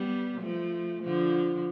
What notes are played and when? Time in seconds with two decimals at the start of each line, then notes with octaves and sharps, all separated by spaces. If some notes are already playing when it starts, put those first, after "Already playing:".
Already playing: G3 B3
0.41 F3 A3
1.03 D3 F3